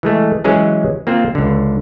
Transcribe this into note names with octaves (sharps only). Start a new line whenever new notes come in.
E3 G#3 A3
E3 F#3 G#3 C#4 G#4
A#3 C4 F4 C5
C#2 D3